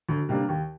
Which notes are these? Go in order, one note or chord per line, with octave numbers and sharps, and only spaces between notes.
D2
C3 G3 A#3 D4
D#2